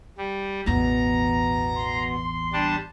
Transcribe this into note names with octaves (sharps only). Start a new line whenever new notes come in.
G3
A1 E2 B2 B3 A#5
C6
G3 D4 A5